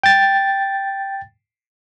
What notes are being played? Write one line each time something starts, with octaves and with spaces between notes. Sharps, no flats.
G5 A6